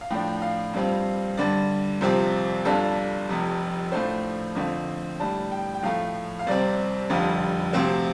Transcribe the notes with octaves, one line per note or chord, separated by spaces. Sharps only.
F5
A2 F3 D4 G5
F5
G2 G3 C4 F4
G2 D3 G3 D5
C2 C3 F3 C4 F4
G1 G2 G3 D4 F4 A4
F1 F2 C3
A2 F3 A3 D4 C5
F2 D3 A3 C4 F4
A2 G3 D4 A5
G5
G5
A2 F3 A3 F5
F5
C2 C3 G3 C4 D5
F1 F2 D3 G3 F4
D2 C3 F3 C4 F4 C5